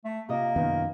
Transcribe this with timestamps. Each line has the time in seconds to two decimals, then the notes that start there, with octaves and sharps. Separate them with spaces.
0.05 A3
0.29 C3 A#3 F4 D#5
0.56 F#2 D#3 B3